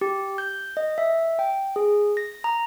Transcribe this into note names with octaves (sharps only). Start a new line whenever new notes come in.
G4
G6
D#5
E5
G5
G#4
A#6
A#5